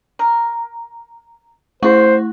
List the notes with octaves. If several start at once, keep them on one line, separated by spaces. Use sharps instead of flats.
A#4
A3 E4 F#4 C5